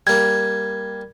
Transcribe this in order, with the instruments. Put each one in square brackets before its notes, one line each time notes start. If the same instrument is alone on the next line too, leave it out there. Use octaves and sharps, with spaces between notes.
[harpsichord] G3 A#3 [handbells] G#6